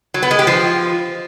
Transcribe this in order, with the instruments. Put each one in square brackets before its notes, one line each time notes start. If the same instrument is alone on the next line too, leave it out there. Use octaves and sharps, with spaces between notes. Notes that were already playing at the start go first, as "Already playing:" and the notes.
[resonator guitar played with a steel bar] F#3
B3
G#3
G4
F3